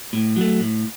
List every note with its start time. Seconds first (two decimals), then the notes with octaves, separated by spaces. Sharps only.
0.13 A2
0.36 F#3 A3
0.60 A2